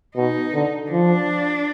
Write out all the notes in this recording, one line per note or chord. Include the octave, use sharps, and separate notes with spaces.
B2 D#4
D3
F3 D4